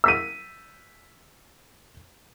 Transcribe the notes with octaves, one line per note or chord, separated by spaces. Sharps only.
E6 B6 D#7